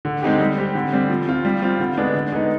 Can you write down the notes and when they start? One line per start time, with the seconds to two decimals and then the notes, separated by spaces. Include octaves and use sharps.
0.05 D3
0.22 G#3 C4 D#4 G4
0.40 G3
0.58 C4 G4
0.75 D3
0.92 G3 C4
1.10 F3
1.27 C4 F4
1.45 G3
1.62 C4 F4
1.80 D3
1.97 G#3 B3 D4
2.15 D3
2.32 G#3 B3 D#4